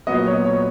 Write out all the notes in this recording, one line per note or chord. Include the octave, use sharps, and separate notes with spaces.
A#2 F#3 B3 D#5
C#5
C#5